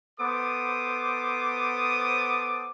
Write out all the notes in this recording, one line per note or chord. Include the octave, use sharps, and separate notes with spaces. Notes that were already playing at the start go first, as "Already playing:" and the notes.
B3 A4 C5 D6 D#6